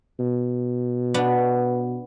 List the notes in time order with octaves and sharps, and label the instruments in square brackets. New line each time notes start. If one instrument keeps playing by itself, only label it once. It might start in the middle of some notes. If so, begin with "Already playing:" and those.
[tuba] B2
[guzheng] B3 D4